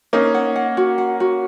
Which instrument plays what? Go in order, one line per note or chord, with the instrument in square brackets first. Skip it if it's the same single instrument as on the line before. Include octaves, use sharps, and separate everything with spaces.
[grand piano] A#3 C#4 [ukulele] D#4
[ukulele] F#5
F#5
F#4
F#5
F#4